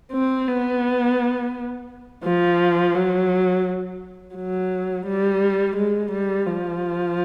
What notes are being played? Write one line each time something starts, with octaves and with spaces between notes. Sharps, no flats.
C4
B3
F3
F#3
F#3
G3
G#3
G3
F3